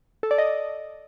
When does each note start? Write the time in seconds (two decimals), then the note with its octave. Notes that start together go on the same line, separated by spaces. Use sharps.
0.23 A4
0.31 D5
0.38 D#5